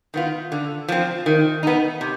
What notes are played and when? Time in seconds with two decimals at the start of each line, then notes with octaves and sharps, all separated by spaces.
0.14 D#3 B3 F4
0.52 D3
0.88 F3 C4
1.26 D#3
1.63 B3 D#4
2.01 C3